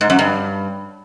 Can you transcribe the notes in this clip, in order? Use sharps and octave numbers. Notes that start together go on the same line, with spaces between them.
G#2
F#2
G2